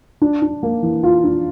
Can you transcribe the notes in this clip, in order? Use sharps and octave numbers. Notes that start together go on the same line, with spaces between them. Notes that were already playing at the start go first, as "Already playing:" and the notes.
D4
D4
A#3
E3
F4
D4